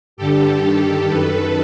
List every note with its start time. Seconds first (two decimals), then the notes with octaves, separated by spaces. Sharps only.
0.17 G2 D3 G4 A4
0.63 G2 D#3
1.08 F#2 D#3 A4 B4